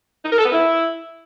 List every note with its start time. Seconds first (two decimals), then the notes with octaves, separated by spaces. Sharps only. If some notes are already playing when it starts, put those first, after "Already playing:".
0.25 D#4
0.31 A#4
0.38 A4
0.45 B3
0.52 E4